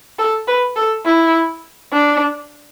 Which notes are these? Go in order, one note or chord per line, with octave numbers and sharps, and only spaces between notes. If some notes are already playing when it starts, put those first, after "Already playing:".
A4
B4
A4
E4
D4